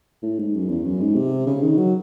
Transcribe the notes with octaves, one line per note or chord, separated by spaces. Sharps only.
A2
G#2
F#2
E2
F#2
G#2
C3
C#3
D#3
F#3